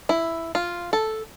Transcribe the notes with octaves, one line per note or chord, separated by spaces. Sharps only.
E4
F4
A4